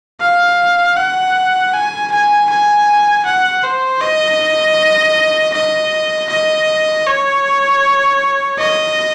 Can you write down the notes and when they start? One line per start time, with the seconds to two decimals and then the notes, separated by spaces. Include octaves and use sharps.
0.21 F5
0.97 F#5
1.74 G#5
2.12 G#5
2.50 G#5
3.25 F#5
3.63 C5
4.01 D#5
5.54 D#5
6.30 D#5
7.07 C#5
8.59 D#5